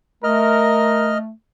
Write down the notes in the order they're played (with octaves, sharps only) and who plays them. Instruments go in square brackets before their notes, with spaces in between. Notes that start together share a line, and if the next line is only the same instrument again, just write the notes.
[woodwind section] A3 [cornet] A#4 [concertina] D#5 F6